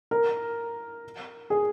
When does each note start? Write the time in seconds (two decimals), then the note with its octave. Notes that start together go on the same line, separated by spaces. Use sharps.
0.11 A#4
1.50 G#4